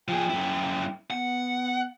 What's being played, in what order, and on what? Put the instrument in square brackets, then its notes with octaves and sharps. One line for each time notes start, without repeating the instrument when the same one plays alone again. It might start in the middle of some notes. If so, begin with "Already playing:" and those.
[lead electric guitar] F3 G#4 [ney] G5
[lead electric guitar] F#2 E4
[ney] B3 [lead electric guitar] F#5